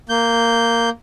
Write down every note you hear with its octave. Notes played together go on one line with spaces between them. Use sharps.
A#3 G6